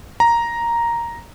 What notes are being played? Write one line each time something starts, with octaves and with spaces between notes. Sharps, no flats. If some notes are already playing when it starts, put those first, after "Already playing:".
A#5